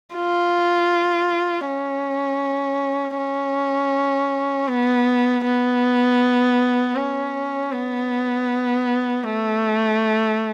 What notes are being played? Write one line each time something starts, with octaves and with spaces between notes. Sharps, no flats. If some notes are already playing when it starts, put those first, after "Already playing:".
F4
C#4
C#4
B3
B3
C#4
B3
A3